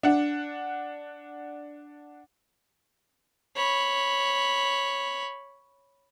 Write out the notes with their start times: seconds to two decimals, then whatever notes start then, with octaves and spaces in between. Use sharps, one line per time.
0.03 D4 F#5
3.56 C#5 B5